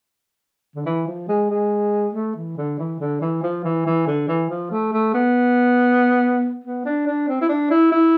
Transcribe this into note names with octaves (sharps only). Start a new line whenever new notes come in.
D3
E3
F3
G#3
G#3
A3
E3
D3
E3
D3
E3
F3
E3
E3
D3
E3
F3
A3
A3
B3
B3
D4
D4
C4
E4
D4
E4
E4